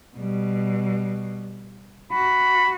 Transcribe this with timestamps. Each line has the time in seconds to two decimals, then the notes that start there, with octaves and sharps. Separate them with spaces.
0.17 B2 G3
2.12 F#4 B5